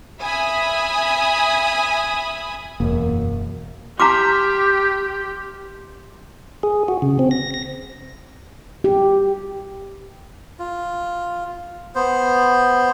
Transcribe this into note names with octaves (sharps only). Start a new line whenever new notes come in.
E5 G#5 B5 D#6
E1 F#2 A#3
G4 A#5 C6 D6 F6 B6
G#4
F#4
C#3
C4
A#6
A#6
G4
F4
B3 C5